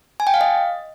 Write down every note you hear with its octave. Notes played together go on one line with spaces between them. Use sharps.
G#5
G5
F5
D#5